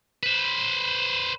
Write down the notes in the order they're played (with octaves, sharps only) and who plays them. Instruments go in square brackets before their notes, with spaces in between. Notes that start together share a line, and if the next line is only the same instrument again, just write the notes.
[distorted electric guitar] B4 C5